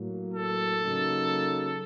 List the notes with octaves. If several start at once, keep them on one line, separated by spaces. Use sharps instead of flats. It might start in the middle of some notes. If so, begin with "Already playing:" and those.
Already playing: A2 F#3 A#3
A4
C#3 F#3 A#3 D#4